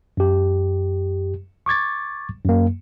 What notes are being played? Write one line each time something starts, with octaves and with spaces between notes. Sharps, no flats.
F#2 G4
C#6 D6 G#6 A6
F#2 A#3